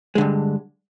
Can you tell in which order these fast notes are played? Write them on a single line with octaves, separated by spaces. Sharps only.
G#3 D3 G2